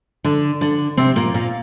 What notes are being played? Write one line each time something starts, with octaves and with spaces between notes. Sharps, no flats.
D3 D4
D3 D4
C3 C4
A#2 A#3
A#2 A#3